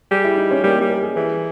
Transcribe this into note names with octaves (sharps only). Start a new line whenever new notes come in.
G3 G#4
E4
D#4
C#4
G3 A#3
G3 C#4
A#4
G#4
E3 G#4